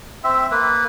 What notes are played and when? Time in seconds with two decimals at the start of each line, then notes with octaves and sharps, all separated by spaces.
0.24 C4 E5
0.51 A#3 B4